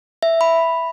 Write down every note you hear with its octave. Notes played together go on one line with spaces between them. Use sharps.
E5
B5